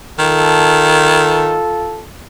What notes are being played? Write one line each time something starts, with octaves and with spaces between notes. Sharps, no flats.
D#3 F4 A4